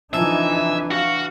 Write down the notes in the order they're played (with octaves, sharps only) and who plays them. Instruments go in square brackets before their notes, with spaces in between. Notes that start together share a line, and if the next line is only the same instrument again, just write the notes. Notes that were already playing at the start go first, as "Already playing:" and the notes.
[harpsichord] F2 A4 [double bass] E3 D4 [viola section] D#4 G#5 [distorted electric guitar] E5
[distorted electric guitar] F#4 [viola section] F5